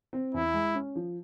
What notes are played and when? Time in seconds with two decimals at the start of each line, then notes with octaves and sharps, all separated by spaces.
0.13 C4
0.34 E2 E4
0.54 G#3
0.75 C#4
0.95 F3